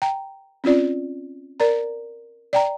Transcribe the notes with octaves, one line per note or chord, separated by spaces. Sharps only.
G5 A#5
C4 C#4 F4 D5
A#4 D5 A#5
D5 G5 A#5